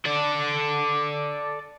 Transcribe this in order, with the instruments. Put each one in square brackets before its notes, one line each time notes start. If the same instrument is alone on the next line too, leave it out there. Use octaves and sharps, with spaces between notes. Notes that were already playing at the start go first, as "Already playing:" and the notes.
[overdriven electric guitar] A4 D5